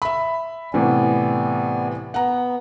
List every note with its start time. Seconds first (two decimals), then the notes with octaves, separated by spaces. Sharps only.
0.02 E5 B5
0.74 A2 C3 E3 B3 D5 G#5
2.14 B3 F#5 A#5